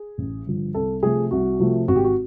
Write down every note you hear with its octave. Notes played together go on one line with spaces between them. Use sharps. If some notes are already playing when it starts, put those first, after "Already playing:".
Already playing: G#4
A1
G2 D3 F3
C2 A4
C3 F3 A3 G#4
C2 F#4
C3 F3 A3
G#1 F#4
G4
F#4